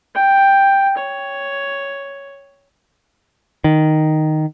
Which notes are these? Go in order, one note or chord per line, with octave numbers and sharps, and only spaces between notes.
G5
C#5
D#3